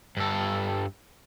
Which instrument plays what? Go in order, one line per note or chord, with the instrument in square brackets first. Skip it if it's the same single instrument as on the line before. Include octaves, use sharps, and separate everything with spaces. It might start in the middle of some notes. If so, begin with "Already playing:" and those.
[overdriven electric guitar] G2 A4